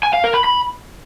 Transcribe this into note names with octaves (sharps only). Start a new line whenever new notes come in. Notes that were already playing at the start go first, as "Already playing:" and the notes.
G#5
F5
A#4
B5
B5